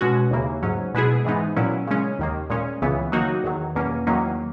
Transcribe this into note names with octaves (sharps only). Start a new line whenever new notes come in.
B2 G#3 C#4 F#4
D#2 C#3 E3 A#3
G#2 F#3 C#4
B2 G#3 B3 E4 G#4
G#2 E3 G#3 B3 D#4
A#2 F#3 C#4 E4
C#3 G#3 C#4
D#2 D#3 A#3
A#2 G#3 C#4
C#2 C#3 E3 B3
D#3 F#3 A#3 D#4 F#4
E2 D#3 F#3
E2 B2 A#3 C#4
E2 D#3 F#3 A#3 C#4